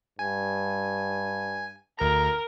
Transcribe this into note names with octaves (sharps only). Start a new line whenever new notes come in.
G2 G#5
D2 A#4 A#5